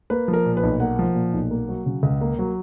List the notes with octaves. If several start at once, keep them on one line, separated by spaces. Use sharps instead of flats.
A#3 B4
F3
A#4
A#2
B4
B1
A#3 F#5
F3
A#2
B1
A#3
F#3
C#3
C#2
A#3
F#3